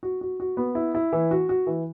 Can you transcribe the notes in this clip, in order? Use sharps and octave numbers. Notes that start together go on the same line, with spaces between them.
F#4
F#4
F#4
B3
E4
E4
E3
F#4
F#4
E3